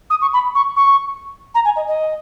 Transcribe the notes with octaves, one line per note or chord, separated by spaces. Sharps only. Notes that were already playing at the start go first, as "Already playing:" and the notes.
D#6
C#6
B5
C#6
C#6
A#5
G#5
D#5
D#5